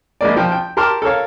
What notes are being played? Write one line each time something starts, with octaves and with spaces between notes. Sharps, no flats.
A#1 G#3 A#3 D5
F3 G5
G5
G4 A#4 A5 C6 D6 F6
A4 A#4 C#5 F5